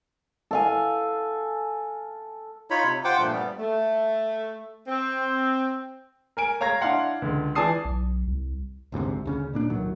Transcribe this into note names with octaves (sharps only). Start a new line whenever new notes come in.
A4 F5 G#5
D#4 F4 C#5 B5
C3
F4 C5 F#5 G5 D6
G2 A#2 F3 A3
G3 B3
A3
C4
A#4 G#5 D7
C#5 F5 A#5 G#6 A#6
D4 E4 F5 F#5 C6
C#2 D3
E3 D5 G#5 A5 D#6 C7
B1
C2
A1 D2 G#2 C3
D2 C#3 C#4
A#2 A#3 D4
C#2 A2 D#3 F#3